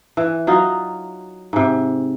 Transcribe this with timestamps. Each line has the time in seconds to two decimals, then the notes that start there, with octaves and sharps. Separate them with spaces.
0.17 E3
0.47 F#3 D#4 F4
1.53 G#2 C3